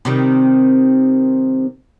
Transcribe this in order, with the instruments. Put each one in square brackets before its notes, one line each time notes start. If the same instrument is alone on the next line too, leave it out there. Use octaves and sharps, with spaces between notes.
[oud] C3 D#3 G3